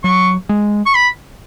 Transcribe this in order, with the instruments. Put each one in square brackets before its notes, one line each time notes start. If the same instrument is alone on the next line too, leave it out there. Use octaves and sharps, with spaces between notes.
[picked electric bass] F#3 [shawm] C#6
[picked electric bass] G#3
[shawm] C#6
B5